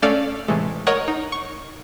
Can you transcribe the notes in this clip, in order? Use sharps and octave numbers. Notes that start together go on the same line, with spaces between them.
A3 C#4 A4 D5 F5
A2 C3 E3 G#3 A3
A#4 C#5 D#5 F#5
D#4
C#6